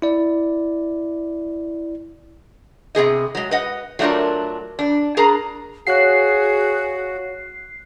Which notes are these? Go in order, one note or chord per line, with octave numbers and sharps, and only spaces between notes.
E4 D5
C3 B3 G#4 D#5
F#3 G#3
B4 D#5 F#5
F#3 A3 D4 E4 F4 A#4
D4
D4 G#4 A#4 A#5
F#4 G#4 C#5 F5 F#5 F#6 C7